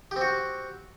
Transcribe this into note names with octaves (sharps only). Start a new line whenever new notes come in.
C4 F#4 G4